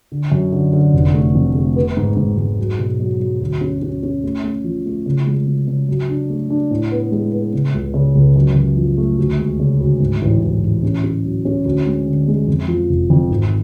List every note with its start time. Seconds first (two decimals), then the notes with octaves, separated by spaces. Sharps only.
0.12 D3
0.32 F#2
0.52 D3
0.73 D3
0.93 F1
1.14 A3
1.35 F2
1.55 A3
1.76 B3
1.97 G#2
2.17 G#2
2.38 G#2
2.58 F#3
2.78 B2
3.00 F#3
3.20 F#3
3.41 D2
3.61 C#4
3.82 C#4
4.03 C#4
4.23 A3
4.44 A3
4.64 F3
4.86 A3
5.06 C#3
5.27 G#3
5.47 C#3
5.67 C#3
5.89 F#3
6.09 D4
6.30 A3
6.50 D4
6.71 A2
6.92 B3
7.12 G#3
7.33 B3
7.53 C#3
7.74 C#2
7.94 C#3
8.15 C#2
8.36 F#2
8.56 F#2
8.77 F3
8.98 A3
9.19 D2
9.39 G#3
9.60 C#3
9.80 D2
10.00 G#2
10.21 A1
10.42 A1
10.62 A1
10.83 C#4
11.04 C#4
11.24 F#3
11.45 C#4
11.65 D2
11.86 G#3
12.07 D3
12.28 G#3
12.47 F2
12.68 F3
12.89 F1
13.10 F2
13.31 G#1